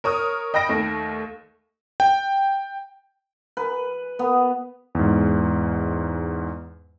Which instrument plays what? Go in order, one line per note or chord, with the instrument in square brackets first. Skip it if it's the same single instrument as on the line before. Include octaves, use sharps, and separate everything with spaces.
[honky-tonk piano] A#4 C#5 D#6 F6
D#5 G5 B5 A#6 D7
D#2 A3
[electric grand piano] G5
[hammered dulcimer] B4
B3
[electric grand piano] E2 G#2